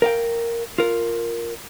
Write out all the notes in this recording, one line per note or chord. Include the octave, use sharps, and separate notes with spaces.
A#4 F5 G5
F4 A#4